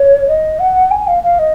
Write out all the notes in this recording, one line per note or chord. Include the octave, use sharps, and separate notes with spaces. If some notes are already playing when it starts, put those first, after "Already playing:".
Already playing: C#5
D#5
F#5
G#5
F5
F5
D#5